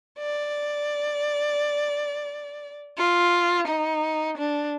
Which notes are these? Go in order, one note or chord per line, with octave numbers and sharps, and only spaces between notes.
D5
F4
D#4
D4